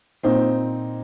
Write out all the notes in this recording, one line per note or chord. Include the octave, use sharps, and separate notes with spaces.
A#2 C4 D#4